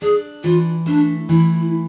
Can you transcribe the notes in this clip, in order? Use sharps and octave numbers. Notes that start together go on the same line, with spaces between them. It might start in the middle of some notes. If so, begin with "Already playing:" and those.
D4 G#4
E3 F4
A3 D4
E3 E4